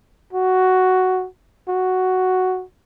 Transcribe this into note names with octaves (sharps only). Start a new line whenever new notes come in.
F#4
F#4